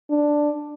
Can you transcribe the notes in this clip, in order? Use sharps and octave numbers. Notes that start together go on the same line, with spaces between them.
D4